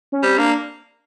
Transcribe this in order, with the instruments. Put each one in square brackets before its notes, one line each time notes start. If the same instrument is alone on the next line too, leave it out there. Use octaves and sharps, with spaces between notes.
[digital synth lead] C#4
[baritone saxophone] G3 [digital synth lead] C4
[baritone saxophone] A#3 [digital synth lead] D4